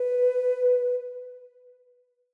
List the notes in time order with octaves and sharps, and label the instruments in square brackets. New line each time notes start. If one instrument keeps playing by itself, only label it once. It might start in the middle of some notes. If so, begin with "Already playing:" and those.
Already playing: [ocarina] B4